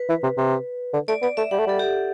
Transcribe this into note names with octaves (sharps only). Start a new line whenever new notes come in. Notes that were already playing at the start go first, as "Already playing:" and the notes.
Already playing: B4
E3
C3
C3
D3
A3 D5
B3 D5
A3 E5
G3 F#5
A3
G3 A4
G4